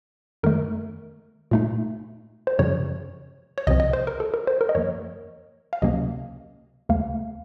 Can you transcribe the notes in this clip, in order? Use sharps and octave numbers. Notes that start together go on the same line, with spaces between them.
F#2 D#3 A3 A#4
A#2 A3 D#4
C5
F#2 C#3 F3 C#5
C#5
C2 C3 F3 C4 D#5
D#5
C5
A#4
A4
A#4
C5
A#4
D#5
F#2 F3 A#3 C#5
F5
C#2 C3 F#3 A#3 C#4 D#5
D#2 C#3 A3 F5